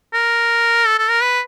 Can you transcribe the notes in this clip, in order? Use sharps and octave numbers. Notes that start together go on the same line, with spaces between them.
A#4
A4
A4
A#4
B4